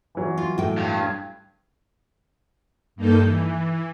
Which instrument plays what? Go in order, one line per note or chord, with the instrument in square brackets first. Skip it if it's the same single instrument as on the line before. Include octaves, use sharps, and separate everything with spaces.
[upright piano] E3 F#3
[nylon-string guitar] F4
A2 G5
[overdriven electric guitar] G2
[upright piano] G#6
[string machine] G2 A#3 D#4 A4 G6
E3